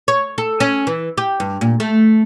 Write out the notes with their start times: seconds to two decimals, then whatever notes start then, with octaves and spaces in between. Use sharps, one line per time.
0.08 C#5
0.38 A4
0.60 C#4
0.87 E3
1.18 G4
1.40 G2
1.61 A#2
1.80 A3